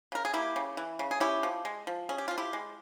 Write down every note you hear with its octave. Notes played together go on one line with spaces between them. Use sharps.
C#3 A#4
G#4
A#3 E4 G4
C#3
E3
C#3
G#4
C#4 E4 G4
F3
G#3
F3
C#4 G#4
G4
F3 F4
E4 G4
G#3